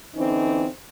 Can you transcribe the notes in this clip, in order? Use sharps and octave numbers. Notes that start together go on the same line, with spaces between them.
D3 E3 C4 C#4 D#4